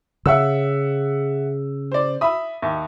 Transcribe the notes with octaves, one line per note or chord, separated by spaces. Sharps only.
C#3 E5 F#5 E6
C5 D5
E5 B5 D#6
D#2 E5